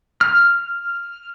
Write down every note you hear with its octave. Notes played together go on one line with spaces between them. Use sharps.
F6